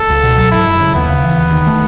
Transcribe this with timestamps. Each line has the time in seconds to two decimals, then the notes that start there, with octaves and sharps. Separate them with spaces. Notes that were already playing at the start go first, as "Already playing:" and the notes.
Already playing: A4
0.09 C#2
0.23 B2
0.37 F#3
0.52 G#1 E4
0.67 F#2
0.80 C#3
0.95 D#2 B3
1.09 C#3
1.23 E3
1.38 D#2
1.53 D#3
1.67 A3